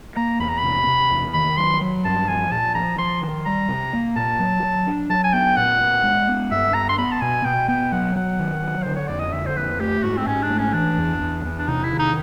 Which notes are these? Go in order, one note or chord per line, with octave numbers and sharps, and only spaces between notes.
A#3 A#5
E2 B5
A#5
C3 B5
C3
E2
D#3 B5
F#3 C6
F#3
G2 A5
F3 G#5
A#2 A5
F3 A#5
F3 C6
D#3
G3 A#5
C3
A#3
A#2 A5
F#3
F#3
D4
F#3 A5
G#5
B3 G5
A#2 F#5
B3
G#3
B3
G2 E5
B3 A#5
C6
B3 B5
A5
B2 G#5
B2 G5
B3 G5
F#3 F#5
F#3 F#5
D#3
F#3
D3 C5
C#5
F2 D5
D#5
D3 E5
C5
F2 B4
A3 G4
G#2 F#4
C4
G#2 C#4
D4
A3
C#4
E3 D4
E2
E2
E2
D4
C3 D#4
E4
D#3
D#4